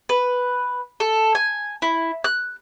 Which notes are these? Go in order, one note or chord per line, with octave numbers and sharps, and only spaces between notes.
B4
A4
G#5
E4
F#6